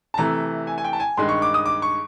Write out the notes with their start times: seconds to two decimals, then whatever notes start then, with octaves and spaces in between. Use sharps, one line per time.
0.14 A5
0.18 C3 E3 A3 A#5
0.67 G#5
0.78 G#5
0.84 G5
0.93 A5
1.00 G#5
1.17 G2 D#3 G#3 C6
1.29 C#6
1.42 D6
1.54 D#6
1.66 D6
1.82 C#6